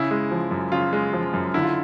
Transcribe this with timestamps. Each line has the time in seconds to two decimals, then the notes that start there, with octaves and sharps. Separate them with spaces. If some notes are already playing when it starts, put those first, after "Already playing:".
Already playing: C#3 E4
0.11 G#3
0.31 F3
0.51 F#2
0.72 C#3 F4
0.93 G#3
1.13 F3
1.34 F#2
1.54 D3 E4
1.63 F4